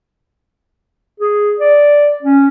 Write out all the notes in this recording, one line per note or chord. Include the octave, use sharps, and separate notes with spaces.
G#4
D5
C#4